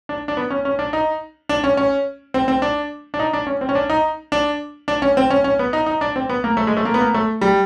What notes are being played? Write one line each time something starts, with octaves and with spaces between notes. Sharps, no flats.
D4
D4
B3
C#4
C#4
D4
D#4
D4
C#4
C#4
C4
C4
D4
D4
D#4
D4
C#4
C4
C#4
D4
D#4
D4
D4
C#4
C4
C#4
C#4
B3
D#4
D#4
D4
C4
B3
A#3
A3
G#3
A3
A#3
B3
A#3
A3
G3